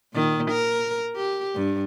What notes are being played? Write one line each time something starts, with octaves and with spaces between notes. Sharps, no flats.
A#2 D#3
A#4
G4
G2